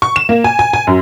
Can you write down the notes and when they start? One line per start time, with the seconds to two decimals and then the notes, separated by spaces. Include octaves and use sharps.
0.02 C#6
0.16 E7
0.29 A#3
0.44 G#5
0.59 G#5
0.73 G#5
0.87 F#2